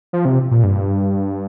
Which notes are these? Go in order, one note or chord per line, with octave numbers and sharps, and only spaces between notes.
F3
C3
A#2
G2